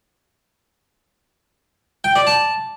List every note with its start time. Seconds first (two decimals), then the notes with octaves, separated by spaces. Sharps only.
2.04 G5
2.16 D5
2.27 A5